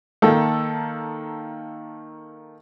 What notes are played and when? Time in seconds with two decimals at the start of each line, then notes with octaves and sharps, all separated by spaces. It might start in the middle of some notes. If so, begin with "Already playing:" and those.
0.22 D#3 A#3 D#4 A4